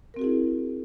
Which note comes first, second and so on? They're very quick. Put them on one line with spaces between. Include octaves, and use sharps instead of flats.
A#4 C4 F#4 G#4 E4